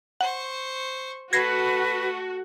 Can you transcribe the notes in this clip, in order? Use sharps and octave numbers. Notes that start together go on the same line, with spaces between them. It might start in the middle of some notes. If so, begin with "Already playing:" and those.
C5 F#5 C#6
A3 F#4 B4 G#6 A#6 C7